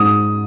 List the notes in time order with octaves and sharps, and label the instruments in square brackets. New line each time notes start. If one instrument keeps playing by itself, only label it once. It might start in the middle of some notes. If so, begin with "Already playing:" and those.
Already playing: [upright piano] G#2 D#6